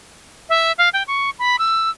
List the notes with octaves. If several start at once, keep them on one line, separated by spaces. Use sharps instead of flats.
E5
F5
G5
C#6
B5
E6